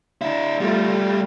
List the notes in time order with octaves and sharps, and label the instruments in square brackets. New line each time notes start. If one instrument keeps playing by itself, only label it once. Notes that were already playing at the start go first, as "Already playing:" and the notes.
[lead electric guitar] D4 E4
[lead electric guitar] E2 G3 [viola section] A3 F4